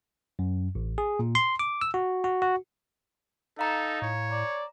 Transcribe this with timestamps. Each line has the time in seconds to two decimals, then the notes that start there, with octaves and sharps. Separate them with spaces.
0.39 F#2
0.75 A1
0.98 G#4
1.19 A#2
1.35 C6
1.59 D6
1.81 E6
1.94 F#4
2.24 F#4
2.42 F#4
3.59 D#4 A4 F5 A#5
4.02 A2 C#5
4.31 D5 A#5